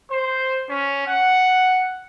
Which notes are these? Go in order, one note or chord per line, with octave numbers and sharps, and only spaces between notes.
C5
C#4
F#5